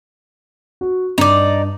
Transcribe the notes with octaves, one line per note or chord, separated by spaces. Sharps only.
F#4
G2 D#4 D5